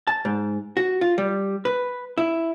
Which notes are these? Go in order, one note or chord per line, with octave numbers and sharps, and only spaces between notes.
A5
G#2
F#4
F4
G3
B4
E4